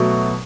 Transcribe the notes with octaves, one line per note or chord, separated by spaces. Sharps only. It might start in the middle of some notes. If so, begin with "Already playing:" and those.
Already playing: B2 F#3 A3